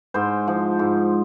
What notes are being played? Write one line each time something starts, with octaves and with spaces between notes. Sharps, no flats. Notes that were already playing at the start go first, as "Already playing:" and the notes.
G#2 C5
F3
G#2